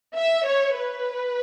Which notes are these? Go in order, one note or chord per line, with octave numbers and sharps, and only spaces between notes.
E5
C#5
B4